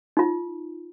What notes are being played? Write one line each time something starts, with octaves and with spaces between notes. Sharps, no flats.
D#4 F4